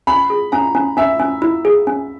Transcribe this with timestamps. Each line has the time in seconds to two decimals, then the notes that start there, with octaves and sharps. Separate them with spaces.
0.07 C#4 B5
0.30 G#4
0.52 C#4 A#5
0.75 C#4
0.97 C#4 E5
1.20 C#4
1.42 E4
1.65 G#4
1.87 C#4